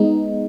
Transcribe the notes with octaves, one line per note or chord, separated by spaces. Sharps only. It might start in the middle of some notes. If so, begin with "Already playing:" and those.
Already playing: G#3 B3 D#4